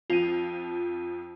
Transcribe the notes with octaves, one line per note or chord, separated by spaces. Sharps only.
F2 F3 F4 D#7